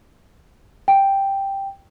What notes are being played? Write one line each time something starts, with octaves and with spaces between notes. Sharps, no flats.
G5